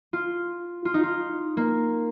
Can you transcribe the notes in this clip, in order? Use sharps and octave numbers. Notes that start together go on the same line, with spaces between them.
F4
F4
D#4
F4
A#3